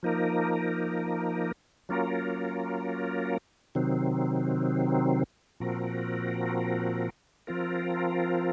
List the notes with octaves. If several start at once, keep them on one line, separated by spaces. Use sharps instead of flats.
F3 A#3 D#4 A#4
F#3 A#3 C#4 F4 A#4
C3 D#3 F#3 C4
A#2 F3 C4 F#4 A#4
F3 C4 F4 A#4